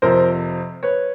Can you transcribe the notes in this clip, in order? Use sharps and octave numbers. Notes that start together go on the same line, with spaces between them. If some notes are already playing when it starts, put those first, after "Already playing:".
F2 C3 F3 A#4 C5
B4 C#5